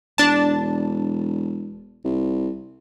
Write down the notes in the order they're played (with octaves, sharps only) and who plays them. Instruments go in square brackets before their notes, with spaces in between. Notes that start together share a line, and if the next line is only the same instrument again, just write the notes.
[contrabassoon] E1 [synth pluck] D4 A5
[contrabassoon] C2